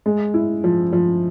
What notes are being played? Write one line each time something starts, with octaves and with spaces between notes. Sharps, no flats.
G#3
E4
F3
F3